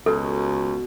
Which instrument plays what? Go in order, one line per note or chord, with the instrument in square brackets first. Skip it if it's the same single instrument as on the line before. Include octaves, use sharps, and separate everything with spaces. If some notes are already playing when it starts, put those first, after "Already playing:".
[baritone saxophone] C#2 [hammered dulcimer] B2 [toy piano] A4